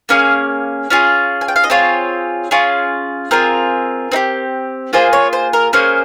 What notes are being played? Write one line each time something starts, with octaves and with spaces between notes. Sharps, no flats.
A#3 C#4 G#4 F5
C#4 F4 G#4
G#5
G5
F5
D#5
C4 F4 G#4 C#5
C#4 F4 G#4
C4 F4 G#4 A#4
C4 D#4 G4
A#3 F4 G#4 C5
C#5
C5
A#4
A#3 C#4 G#4 C5